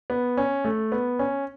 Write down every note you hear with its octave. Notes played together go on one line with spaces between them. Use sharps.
B3
C#4
A3
B3
C#4